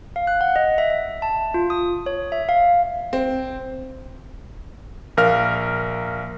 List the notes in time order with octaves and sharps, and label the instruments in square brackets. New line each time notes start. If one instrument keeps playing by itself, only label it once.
[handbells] F5
F#6
F#5
D#5
E5
E5
A5
F4
D#6
C#5
E5
F5
[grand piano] C4
[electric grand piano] A#1 A#4 F5 F6